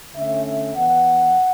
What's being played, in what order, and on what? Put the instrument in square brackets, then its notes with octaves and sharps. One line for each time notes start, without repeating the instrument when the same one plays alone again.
[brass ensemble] D3 A3 C#4 E5
E5
E3 B3 F#5